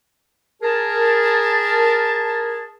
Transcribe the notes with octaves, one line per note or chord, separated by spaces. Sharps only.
G#4 A#4 A5